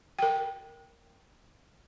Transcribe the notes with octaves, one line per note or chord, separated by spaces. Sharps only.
A#4 G5